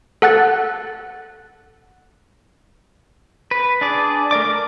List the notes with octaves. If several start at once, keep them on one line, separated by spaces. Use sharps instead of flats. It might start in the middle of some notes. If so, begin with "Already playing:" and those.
A4 F#5 F#6 A6
B4
D4 G#4 D5
A3 A#4 D5 D6
A#4 D6